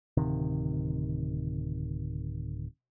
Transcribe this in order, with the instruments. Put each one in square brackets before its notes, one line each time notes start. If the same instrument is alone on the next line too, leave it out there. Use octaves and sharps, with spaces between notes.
[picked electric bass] D1 C3 D#3